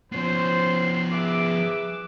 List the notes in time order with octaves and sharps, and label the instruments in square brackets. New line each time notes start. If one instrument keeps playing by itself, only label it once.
[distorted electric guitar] F3 B3 [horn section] C#4 C5 [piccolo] C7
[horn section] G#4 B4 E5 [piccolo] D6